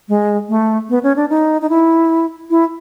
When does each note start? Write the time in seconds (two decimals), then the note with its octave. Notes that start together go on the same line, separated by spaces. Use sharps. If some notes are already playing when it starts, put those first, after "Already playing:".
0.09 G#3
0.49 A3
0.90 B3
1.03 C#4
1.16 D4
1.30 D#4
1.62 D#4
1.69 E4
2.50 E4